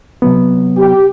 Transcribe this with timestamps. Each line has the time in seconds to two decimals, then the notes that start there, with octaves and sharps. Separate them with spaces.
0.22 C3 F#3 B3
0.77 G4